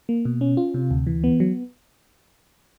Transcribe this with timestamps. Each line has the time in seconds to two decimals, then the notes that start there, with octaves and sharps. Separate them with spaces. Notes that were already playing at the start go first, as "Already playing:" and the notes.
0.09 A#3
0.25 B2
0.41 C#4
0.57 F4
0.74 C3
0.91 D2
1.07 E3
1.24 B3
1.40 F#3